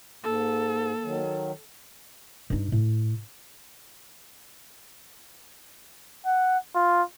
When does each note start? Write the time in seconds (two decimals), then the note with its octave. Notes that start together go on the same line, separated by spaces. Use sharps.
0.24 G#2 A#3 A4
1.03 D#3 F#3
2.50 G2 D#4
2.72 A2
6.26 F#5
6.75 F4